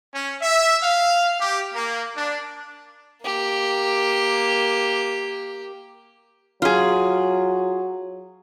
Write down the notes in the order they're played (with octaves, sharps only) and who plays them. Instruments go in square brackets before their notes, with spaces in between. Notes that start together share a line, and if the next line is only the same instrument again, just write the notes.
[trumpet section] C#4
E5
F5
G4
A#3
D4
[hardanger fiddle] A#3 G4
[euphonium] F#3 [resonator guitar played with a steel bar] F4 G#4